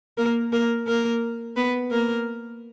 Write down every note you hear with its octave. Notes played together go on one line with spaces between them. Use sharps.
A#3 A#4
A#3 A#4
A#3 A#4
B3 B4
A#3 A#4